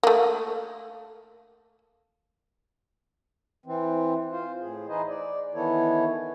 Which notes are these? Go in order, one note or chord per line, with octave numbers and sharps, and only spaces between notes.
A3 A#3
E3 C4
F4 C5
A2 G#4
E3 D#4 G#4 B4 C5 D#5
D5
D#3 E3 B3 E4 A4 C#5